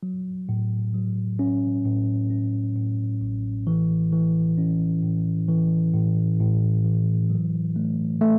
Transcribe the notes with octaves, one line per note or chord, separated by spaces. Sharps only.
F#3
A2
F#3
C#4
A2
C#4
A2
A1
E3
E3
C#4
A2
E3
A2
A2
E3
F#3
A3
A3